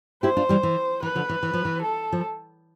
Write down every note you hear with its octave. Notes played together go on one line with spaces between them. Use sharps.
E4 G4 C5
D4 F4
E3 G3
E3
E3 B4
D3 F3
E3
E3
F3
E3
A4
F3